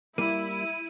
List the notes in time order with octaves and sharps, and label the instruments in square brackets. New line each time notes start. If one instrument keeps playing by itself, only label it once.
[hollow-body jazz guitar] G3 A#3 [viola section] E4 [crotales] D#7